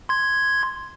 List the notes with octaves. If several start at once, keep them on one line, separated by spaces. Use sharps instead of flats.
C6 G#6